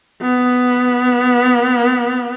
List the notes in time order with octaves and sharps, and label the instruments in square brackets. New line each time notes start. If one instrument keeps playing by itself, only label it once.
[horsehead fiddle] B3